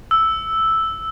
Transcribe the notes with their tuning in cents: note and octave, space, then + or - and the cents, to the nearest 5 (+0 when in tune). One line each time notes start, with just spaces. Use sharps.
E6 -5